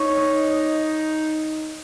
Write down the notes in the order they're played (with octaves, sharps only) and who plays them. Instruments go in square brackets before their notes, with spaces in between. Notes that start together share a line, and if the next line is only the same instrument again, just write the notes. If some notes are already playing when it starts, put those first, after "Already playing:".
Already playing: [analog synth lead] D#4 [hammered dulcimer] C#5
[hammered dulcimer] D#5
D#5